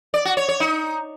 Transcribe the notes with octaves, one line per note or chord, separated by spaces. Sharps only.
D5
F#4
C#5
C#5
D#4